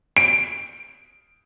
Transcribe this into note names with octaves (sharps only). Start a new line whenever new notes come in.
D7